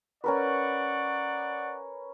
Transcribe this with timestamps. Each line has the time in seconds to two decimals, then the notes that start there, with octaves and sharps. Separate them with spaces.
0.24 C#4 A#4 B4 D5 F#5 C#6